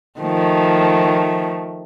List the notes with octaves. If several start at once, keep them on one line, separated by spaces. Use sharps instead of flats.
D#3 F3 A3